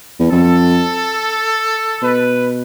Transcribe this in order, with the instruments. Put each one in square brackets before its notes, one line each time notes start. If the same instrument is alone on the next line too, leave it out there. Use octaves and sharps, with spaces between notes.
[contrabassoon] E2
[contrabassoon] F2 [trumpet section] A4
[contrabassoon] B2 [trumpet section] B4